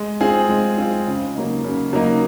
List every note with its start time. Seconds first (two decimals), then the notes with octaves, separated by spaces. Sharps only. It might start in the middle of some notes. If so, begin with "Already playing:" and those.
Already playing: G#3
0.20 C4 F4 G#4
0.49 G#3
0.78 C4 F4 G#4
1.07 C#3
1.35 F#3 A#3 D#4
1.64 C#3
1.93 F#3 A#3 D#4